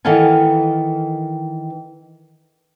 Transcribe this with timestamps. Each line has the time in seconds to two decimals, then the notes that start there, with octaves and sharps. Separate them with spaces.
0.05 D#3 E3 B3 A4 F5 G#5